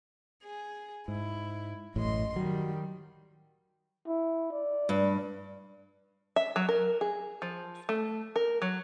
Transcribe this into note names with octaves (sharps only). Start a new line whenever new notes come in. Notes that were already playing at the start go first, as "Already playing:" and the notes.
G#4
G#2 E4
A1 F#2 A2 D#5 C6
D#3 F#3 G3
E4
D5
G2
E5
F#3
A#4
G#4
F3
A3
A#4
F#3